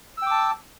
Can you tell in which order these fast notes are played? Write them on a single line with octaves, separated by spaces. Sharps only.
E6 G5 D6 A5